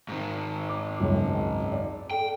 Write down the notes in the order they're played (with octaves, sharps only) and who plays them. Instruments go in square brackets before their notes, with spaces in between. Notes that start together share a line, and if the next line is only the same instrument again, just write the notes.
[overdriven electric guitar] G#2 D#3
[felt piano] D6
C#2 F#2
D5
[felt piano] A4 [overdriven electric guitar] G5